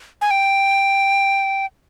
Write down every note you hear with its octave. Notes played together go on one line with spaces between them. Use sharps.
G#5
G5